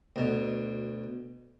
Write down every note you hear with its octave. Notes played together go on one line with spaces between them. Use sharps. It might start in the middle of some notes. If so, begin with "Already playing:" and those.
D2 B2